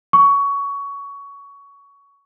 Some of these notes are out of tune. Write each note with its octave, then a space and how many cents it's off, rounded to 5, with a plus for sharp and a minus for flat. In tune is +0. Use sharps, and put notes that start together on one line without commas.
C#6 +20